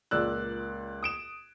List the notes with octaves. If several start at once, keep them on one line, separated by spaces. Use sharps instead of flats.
C#2 A#2 A#3 D5 E6 F#6
D#6 D7 E7